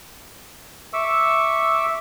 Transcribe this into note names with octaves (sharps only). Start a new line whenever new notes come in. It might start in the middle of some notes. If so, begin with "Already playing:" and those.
E5 C#6 D6 E6